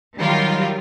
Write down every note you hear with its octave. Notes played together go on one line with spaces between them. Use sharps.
D#3 F#3 G3 F4 A#4